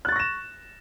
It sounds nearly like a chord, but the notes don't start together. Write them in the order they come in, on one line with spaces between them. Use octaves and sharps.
F#6 A6 C#6 A#6 E7